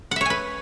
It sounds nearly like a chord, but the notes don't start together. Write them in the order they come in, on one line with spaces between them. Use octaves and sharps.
F#5 E5 C#5 G#5 B4